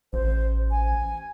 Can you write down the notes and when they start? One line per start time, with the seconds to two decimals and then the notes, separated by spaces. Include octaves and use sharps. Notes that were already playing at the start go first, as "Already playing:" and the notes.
0.13 A1 C5
0.71 G#5